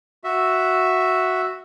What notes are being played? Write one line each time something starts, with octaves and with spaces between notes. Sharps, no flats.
F#4 E5